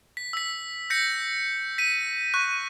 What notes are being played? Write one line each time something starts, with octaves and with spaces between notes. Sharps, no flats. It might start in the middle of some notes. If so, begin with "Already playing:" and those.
B6
E6 B6
G6 A#6 B6 C#7
B6 D#7
C#6 F#6